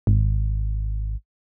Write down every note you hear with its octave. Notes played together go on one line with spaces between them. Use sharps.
G#1